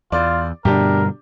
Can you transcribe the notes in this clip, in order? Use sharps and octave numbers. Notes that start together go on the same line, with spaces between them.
E2 F4 D5
G2 B2 D3 D4 G4 A#4